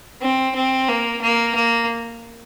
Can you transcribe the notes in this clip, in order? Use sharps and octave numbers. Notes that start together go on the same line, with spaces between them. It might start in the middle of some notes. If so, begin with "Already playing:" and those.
C4
C4
A#3
A#3
A#3